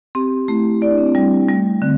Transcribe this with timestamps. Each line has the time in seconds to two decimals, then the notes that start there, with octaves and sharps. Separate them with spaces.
0.15 C4 G4
0.48 A3 E4
0.81 E4 D5
0.91 D4
0.98 C4
1.06 D4
1.15 G3
1.48 G3 A3
1.82 D3 C4